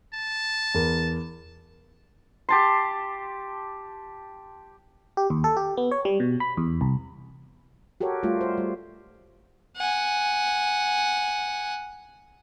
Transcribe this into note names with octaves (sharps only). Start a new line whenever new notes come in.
A5
E2 A#4
G4 A5 C6
G4
D#2
A4
G4
B3
C#5
G3
B2
B5
E2
C2
F#4 G4 A4 A#4 C#5
G3 A3 F4
C5
G3
F#5 G#5